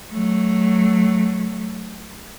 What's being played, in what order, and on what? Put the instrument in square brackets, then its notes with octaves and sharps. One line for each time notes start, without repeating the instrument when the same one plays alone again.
[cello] F#3 A3